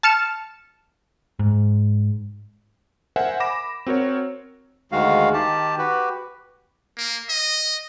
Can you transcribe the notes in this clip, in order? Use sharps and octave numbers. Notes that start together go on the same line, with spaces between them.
A5 F6 C#7 E7
G#2
A#4 C5 E5 F#5 G#5
B5 D6 A#6 E7
C4 F#4 A#4 C#5
D2 D#3 G#3 F#4 F5
D#3 G4 A5
F#4 G4 B4
A#3
D#5